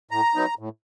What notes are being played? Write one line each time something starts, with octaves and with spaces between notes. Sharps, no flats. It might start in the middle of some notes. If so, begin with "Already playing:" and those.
A2 A#5
F#3 B3 D#4
A2